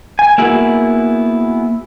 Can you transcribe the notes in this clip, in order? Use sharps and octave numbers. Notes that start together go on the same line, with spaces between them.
G#5
A#3 B3 E4 F#4 G#4